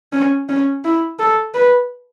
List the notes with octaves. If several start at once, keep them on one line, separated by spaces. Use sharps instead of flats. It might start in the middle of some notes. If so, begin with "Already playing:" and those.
C#4
C#4
E4
A4
B4